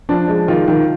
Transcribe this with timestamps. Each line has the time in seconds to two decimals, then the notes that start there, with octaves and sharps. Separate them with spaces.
0.09 F3 D4
0.28 G#3
0.48 D#3 F4
0.68 D#3